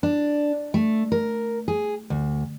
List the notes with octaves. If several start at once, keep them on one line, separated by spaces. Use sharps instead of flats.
D4
A3
A#4
G#4
D2